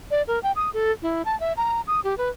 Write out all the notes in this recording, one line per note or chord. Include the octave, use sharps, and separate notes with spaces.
D5
A#4
G5
D#6
A4
E4
A5
E5
A#5
D#6
G4
B4